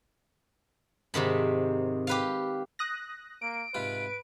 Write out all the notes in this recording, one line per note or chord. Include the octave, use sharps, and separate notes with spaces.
G#2 C3 D#3 B5
G4 B4 F5
D#6 F#6 A#6
A#3 D7
G#2 C3 F4 B4